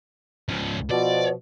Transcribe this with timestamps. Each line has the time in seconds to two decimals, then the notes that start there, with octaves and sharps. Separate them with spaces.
0.49 C#2 F3
0.91 B2 F3 D5